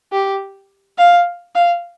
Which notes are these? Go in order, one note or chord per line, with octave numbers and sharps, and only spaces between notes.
G4
F5
F5